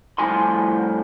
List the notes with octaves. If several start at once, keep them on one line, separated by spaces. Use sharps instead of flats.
C2 A2 F3 G#5 C6